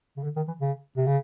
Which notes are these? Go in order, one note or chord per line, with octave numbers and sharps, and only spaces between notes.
C#3
D3
D#3
E3
C#3
C3
C#3